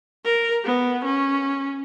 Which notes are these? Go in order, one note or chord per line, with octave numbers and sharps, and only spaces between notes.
A#4
B3
C#4